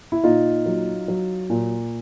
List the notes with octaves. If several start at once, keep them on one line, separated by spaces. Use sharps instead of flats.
E4
A#2 D#4 F4
F#3
F#3
A#2